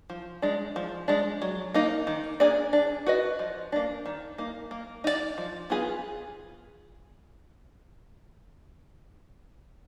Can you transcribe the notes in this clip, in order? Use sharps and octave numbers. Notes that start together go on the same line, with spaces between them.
F3
G#3 D4
F3
G#3 D4
F#3
A#3 D#4
D#3
A#3 D4 G#4 D5
D4
F#4 B4 D#5
F3
A#3 D4
D#3
A#3 D#4
A#3
D#4 F#4 D5
F3
B3 F4 G#4 B4